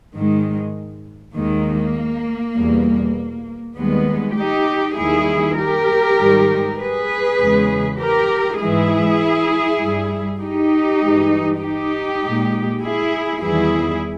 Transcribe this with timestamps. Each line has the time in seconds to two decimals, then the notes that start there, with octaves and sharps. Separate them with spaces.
0.15 G#2 D#3 G#3
1.35 D#2 D#3 G#3 A#3
2.56 E2 B2 G3
3.76 D#2 D#3 G3 G#3 B3
4.37 D#4 G4
4.97 D#2 D#3 G3 E4 G#4
5.58 G4 A#4
6.18 G#2 D#3 G3
6.78 G#4 B4
7.39 E2 C#3 G#3
7.99 G4 A#4
8.59 G#2 E3 G#3 E4 G#4
9.80 G2 G3
10.41 D#4 G4
11.00 G2 E3 G#3
11.61 D#4 G4
12.22 A#2 G#3
12.82 E4 G#4
13.42 E2 D#3 G3 E4 G#4